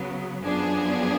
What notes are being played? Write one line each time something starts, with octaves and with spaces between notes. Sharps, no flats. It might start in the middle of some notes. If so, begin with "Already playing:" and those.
Already playing: C#3 F#3 B3
F#2 F3 B3 D4 G#4